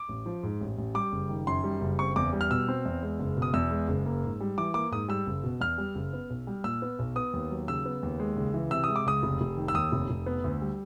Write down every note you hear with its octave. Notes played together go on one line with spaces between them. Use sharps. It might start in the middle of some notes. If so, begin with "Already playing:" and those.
Already playing: D6
A1
F3
G#2
A1
A1
G3 D6
F#1
D#3
F#2 C6
G3
F#1
C4 C#6
E2 D6
G3
F6
B2 E6
C4
E2
G#3
F#1
B2
D#6
E2 E6
G#3
F#1
A#3
G#2
G3
E3 D6
A#3 D6
G#2 D#6
G3 E6
F#1
B2
E2 F6
G3
F#1
B3
B1
G3
A#2 E6
B3
B1
B3 D#6
D#2
F#3
C#3 E6
B3
D#2
G#3
C#2
E3
C3 E6
G#3 D#6
D6
C#2 D#6
F1
F1
D#3
E6
D#2 D#6
F1
F1
B3
D2
G3